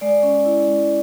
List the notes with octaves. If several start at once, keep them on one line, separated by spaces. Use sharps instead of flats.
G#3 D5
C#4
E4
G#3